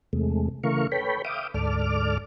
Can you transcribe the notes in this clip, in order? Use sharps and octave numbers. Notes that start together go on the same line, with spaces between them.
E2 C3 G#3 A3
C#3 E3 A3 A#4 F5 C#6
A4 B4 C#5 G5 B5
E5 F5 G5 D6 D#6
D2 G#2 A4 D5 D6 F6